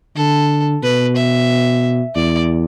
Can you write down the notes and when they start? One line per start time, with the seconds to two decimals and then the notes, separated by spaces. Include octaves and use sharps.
0.17 D3 A4
0.83 B2 B4
1.16 E5
2.15 E2 D5